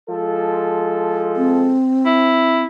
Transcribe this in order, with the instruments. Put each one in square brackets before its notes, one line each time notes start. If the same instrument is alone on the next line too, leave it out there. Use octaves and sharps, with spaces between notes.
[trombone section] F3 G#3 A4
[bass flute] C4
[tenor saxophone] E4